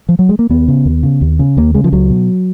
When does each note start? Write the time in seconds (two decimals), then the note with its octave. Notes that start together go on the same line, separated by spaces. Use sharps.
0.09 F3
0.19 F#3
0.29 G#3
0.39 A#3
0.49 D#2 B3
0.68 C#3
0.86 D#2
1.03 C#3
1.21 D#2
1.39 C#3
1.57 D#2 A#3
1.74 C#3 G#3
1.84 F3
1.92 C#2 F#3
2.10 B2